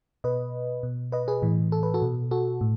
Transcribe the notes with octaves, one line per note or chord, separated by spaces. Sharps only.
B2 B4 D#5
B2
B4 D#5
G#4 B4
A2 E3
A4
B4
F#4 A4
B2
F#4 A4
A2